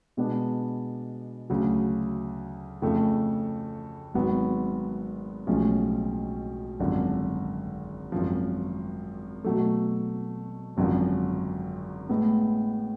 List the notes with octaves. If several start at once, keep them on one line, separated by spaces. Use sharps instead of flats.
B2 G#3 B3 D4
D2 C#3 F#3
F2 C#3 F3 A3
G#1 G#2 F#3 B3
B1 A2 F3 G#3 C#4
G#1 F#2 D3 F3
G#1 F#2 F3
B2 F#3 A3
G#1 F#2 D3 F3
A2 G#3 B3